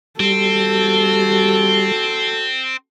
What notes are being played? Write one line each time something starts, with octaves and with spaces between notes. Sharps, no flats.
G3 C4 F#4 A4